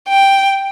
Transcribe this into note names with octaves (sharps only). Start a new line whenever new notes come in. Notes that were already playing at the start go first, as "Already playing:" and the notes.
G5